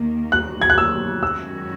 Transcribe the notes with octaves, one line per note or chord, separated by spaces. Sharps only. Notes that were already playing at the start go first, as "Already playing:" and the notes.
Already playing: D#2 D#3 A#3
F#6
G#6
F#6
E6
F#2 D#3 G#3 C#4 F#4 E6